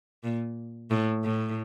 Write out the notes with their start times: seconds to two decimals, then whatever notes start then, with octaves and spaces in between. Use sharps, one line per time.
0.24 A#2
0.91 A2
1.24 A2